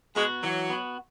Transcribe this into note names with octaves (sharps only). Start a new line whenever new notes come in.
G#3 B3 F#4
E3 F#3
B3 F#4